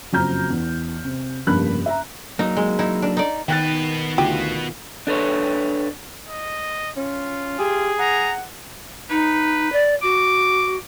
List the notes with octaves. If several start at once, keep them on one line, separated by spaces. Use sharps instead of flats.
F#1 F2 F#4 A#5 F6 G6
E2
C3
F1 G2 C#3 A#3 B5 F#6
E5 A#5
F#3 A#3 D#4
G#3
D#4 E4
D4
D#4 D5
B2 D#3 B4 G5 F#6 A6
D2 F4 G4
D4 A4 B4 C#5
D#5
C#4 F4
G4 G#4
F#5 A#5
D#4 B4
D5
F#4 D6